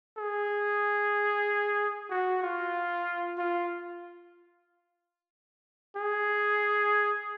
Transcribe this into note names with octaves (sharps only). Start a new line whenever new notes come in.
G#4
F#4
F4
F4
G#4